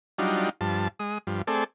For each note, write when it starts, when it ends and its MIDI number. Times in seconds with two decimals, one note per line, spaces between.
0.18 0.49 54
0.18 0.49 55
0.18 0.49 62
0.18 0.49 63
0.18 0.49 65
0.61 0.88 43
0.61 0.88 53
0.61 0.88 81
0.99 1.18 56
0.99 1.18 87
1.27 1.42 43
1.27 1.42 53
1.47 1.64 57
1.47 1.64 60
1.47 1.64 68
1.47 1.64 69
1.47 1.64 74